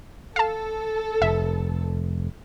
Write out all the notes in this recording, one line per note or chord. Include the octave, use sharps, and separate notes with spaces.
A4 F5 A5
F1 E5